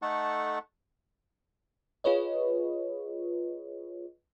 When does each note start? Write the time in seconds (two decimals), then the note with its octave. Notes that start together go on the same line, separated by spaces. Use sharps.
0.02 A3 D#4 A4 F#5 A5 C#6
2.04 F4 G#4 B4 C#5 D#5